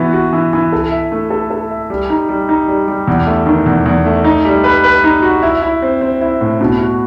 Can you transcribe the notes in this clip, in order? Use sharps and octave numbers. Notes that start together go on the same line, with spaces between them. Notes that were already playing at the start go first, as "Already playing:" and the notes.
Already playing: E3 B3 F#4
F#4
E3
E3
A4
E5
A3
A4
A4
E5
G3
D#4
G3
D#4
G3
G3
E2
A3
D#3
E2
E2
A3
D#4
G3
B4
B4
D#4
F#4
E4
E4
C4
C4
E4
A2
B2
F#4